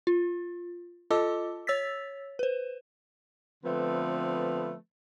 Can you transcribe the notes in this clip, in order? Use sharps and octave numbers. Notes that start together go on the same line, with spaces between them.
F4
F4 A4 D#5 A5 D6 E6
C#5 E6 A6 B6
B4 C5
D3 F3 A3 B3 C4 B4